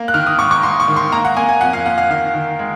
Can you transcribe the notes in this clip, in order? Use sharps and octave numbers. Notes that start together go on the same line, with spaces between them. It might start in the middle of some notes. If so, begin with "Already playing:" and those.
Already playing: A#3
F#6
D#3 F6
D#6
G#2 C#6
C#6
G#2 C6
C#6
D#3
C6
A#3 A#5
F#5
A#3 G#5
G#5
F2 F#5
F5
A#3 F#5
F5
D#3 F5
D#3
G#3